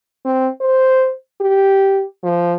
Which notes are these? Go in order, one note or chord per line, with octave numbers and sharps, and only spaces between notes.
C4
C5
G4
F3